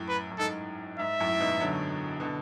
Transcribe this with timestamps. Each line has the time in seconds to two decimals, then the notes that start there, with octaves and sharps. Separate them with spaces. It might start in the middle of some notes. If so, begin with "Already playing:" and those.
Already playing: F#2 A2
0.08 B4
0.31 F#2
0.38 G#2 A4
0.99 G#2 E5
1.20 F#2 A2
1.40 G#2 B2
1.60 D3 F#3
2.20 B2 D3